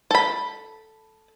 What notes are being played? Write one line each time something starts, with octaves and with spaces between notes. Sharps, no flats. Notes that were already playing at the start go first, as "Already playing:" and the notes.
A4 B5